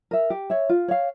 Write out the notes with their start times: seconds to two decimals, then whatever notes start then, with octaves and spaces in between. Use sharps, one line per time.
0.11 A#4 E5
0.30 G4
0.50 C#5 E5
0.69 F4
0.88 C#5 F5